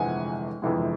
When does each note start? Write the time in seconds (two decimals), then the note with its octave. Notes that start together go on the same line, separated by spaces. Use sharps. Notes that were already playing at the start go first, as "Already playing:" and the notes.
Already playing: G1 F2 C3 E3 G#3 F#5 G#5
0.62 G1 F2 C3 E3 G#3